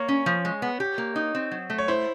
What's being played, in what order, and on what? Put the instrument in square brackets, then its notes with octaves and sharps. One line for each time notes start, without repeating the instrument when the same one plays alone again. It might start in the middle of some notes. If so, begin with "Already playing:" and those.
Already playing: [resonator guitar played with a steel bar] A#3 [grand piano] C#5
[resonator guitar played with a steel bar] C#4
F3
G#3
B3
G4
A#3
D#4
C4
F#3
A3
[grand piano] C#5
[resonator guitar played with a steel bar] E4 [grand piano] C5